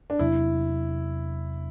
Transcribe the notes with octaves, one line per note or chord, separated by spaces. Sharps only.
D4
E2 C3 F#3 B3 E4